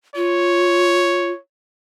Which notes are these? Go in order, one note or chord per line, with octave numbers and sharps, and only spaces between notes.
F4 C#5